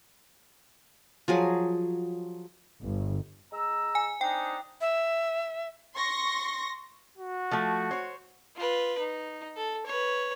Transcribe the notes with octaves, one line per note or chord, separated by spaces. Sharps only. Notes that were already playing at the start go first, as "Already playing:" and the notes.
F3 F#3 G#4
G1
G#3 A#5 E6
G#5
C4 D4 D#4 G5
E5
C6 C#6 A#6
F#4
F3 A3
C5 C#5
F4 B4
D#4
A4
B4 C#5